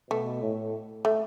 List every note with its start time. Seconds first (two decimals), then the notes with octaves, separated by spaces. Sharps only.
0.11 B2 A3
0.42 A2
1.05 A3